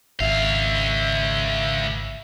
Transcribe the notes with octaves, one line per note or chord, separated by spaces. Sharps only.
G#1 C#2 E5 F5